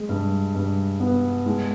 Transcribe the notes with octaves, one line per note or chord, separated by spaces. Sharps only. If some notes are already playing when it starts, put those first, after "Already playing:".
Already playing: G#3
G2
G2
B3
G#3